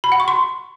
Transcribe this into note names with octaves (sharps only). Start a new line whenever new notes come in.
B5
F#5
C#6
C6